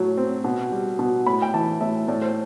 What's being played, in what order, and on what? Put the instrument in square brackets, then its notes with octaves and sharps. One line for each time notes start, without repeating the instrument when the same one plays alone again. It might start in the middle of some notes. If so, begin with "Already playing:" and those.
Already playing: [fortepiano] A2 F#3
C4
B2
G3
B2
A2 B5
G5
E3 A5
A2 E5
A2 D5
C5